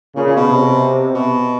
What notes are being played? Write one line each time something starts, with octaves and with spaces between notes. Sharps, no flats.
A#2 C#3
A#2
B2
C3
B2